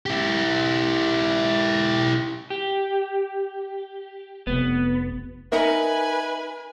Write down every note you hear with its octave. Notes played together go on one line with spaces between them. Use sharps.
E4 G4
G4
F1 B3
D#4 A#4 B4 E5 G#5